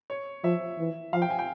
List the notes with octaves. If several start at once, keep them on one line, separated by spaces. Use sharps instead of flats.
C#5
F3 E5
E3
F3 F5
G5
G#5
G5